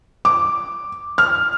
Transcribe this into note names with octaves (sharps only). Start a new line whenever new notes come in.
D6
F6